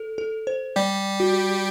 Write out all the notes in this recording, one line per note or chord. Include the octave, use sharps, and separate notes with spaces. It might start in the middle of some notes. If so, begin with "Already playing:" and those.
Already playing: A4
A4
C5
G3 G4 D5
F#4